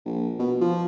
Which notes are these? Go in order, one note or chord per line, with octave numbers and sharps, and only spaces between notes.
A#1
B2
F3